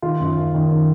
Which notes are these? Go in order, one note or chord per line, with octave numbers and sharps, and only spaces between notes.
D#3 F4
F#2
F#2
D#3
D#3